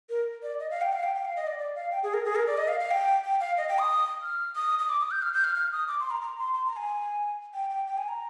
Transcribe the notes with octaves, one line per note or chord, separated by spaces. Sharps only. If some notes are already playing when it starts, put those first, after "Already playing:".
A#4
D5
D#5
F5
G5
F5
G5
G5
F5
D#5
D5
D5
F5
G5
G#4
A#4
G#4
A#4
D5
D#5
F5
F5
G5
G5
F5
D#5
G5
D#6
F6
D#6
D#6
D6
D#6
G6
F6
G6
F6
F6
D#6
D6
C6
A#5
A#5
C6
C6
A#5
G#5
G5
G5
G5
G#5
A#5